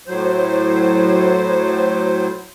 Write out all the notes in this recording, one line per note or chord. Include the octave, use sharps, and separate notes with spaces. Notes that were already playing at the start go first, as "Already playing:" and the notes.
A2 F#3 C5